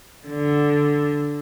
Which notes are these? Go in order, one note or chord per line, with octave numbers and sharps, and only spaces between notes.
D3